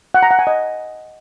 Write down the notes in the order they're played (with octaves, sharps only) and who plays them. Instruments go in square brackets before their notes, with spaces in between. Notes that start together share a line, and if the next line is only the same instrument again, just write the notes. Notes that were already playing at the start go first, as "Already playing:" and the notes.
[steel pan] F#5
A#5
F#5
G#5
D#5